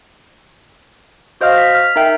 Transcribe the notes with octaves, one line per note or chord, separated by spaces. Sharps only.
F#4 C5 D#5 F5 F6
B6
F6
D#4 A#4 E5 G5